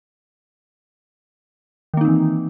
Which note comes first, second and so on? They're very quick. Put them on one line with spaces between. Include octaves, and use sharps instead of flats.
D#3 A#3 D#4 C4 E3